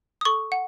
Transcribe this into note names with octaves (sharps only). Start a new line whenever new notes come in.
D#6
A4 C#6
F#5